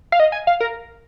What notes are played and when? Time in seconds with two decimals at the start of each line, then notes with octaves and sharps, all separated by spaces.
0.12 F5
0.20 D#5
0.32 G#5
0.47 F5
0.60 A#4